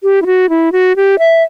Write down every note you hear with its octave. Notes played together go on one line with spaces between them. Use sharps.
G4
E4
F#4
E4
F#4
G4
E5